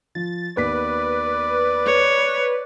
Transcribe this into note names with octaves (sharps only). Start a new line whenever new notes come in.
F3 A6
D#2 B3 B4 D5 B6
C#5